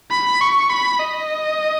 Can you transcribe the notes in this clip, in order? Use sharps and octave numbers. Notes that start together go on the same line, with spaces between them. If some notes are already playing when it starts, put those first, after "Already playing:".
B5
C#6
B5
D#5